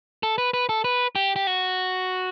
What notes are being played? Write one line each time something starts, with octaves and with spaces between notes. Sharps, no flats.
A4
B4
B4
A4
B4
G4
G4
F#4